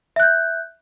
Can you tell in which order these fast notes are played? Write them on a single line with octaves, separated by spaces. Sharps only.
E5 F#6 G6